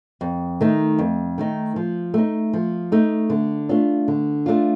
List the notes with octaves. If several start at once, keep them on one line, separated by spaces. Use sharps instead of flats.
F2
D#3 A3 D#4
F2
D#3 A3 D#4
F3
A3 D#4
F3
A3 D#4
D3
A3 D4 F4
D3
A3 D4 F4